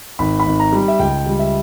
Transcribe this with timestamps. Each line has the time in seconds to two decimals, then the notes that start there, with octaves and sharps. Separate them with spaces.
0.19 G#1 B5
0.40 B5
0.46 G#1
0.60 A#5
0.72 G3
0.88 E5
0.99 C#2 G5
1.26 G3
1.39 E5